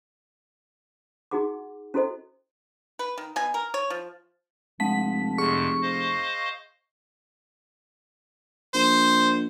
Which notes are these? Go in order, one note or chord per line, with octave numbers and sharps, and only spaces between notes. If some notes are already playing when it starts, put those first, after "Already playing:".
D#4 F#4 G#4 F#5 D6
C#4 E4 F#4 A4 C5 D#5
B4
D#3
B2 G#5
A#4
C#5
F3
F1 G#3 F#5 A5 B6
F2 C3 G#4 C#6
C5 D#5 F5
E7
A#1 C5